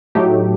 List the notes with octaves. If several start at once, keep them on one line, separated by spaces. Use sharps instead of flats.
A2 F#3 A3 D#4 G4